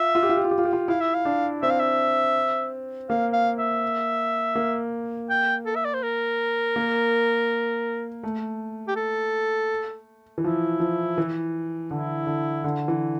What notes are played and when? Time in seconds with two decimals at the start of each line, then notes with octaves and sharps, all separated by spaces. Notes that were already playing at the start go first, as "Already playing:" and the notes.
Already playing: F4 E5
0.15 F4
0.23 G4
0.30 F4
0.37 G4
0.45 F4
0.51 G4
0.58 F4
0.65 G4
0.73 F4
0.88 E4 F5
1.01 E5
1.14 F5
1.25 D4
1.63 C4 E5
1.70 F5
1.80 E5
3.10 A#3 F5
3.33 F5
3.58 E5
4.55 A#3
5.30 G5
5.66 A4
5.76 E5
5.85 D5
5.94 C5
6.03 A#4
6.76 A#3
8.23 A3
8.88 G4
8.96 A4
10.38 E3
10.44 F3 E4
10.80 F3
11.18 E3
11.90 D3 E4
12.27 D3
12.64 D3
12.88 E3